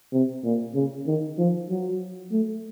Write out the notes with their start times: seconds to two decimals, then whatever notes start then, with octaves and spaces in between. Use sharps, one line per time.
0.13 C3
0.44 A#2
0.75 C#3
1.07 D#3
1.38 F3
1.70 F#3
2.31 A3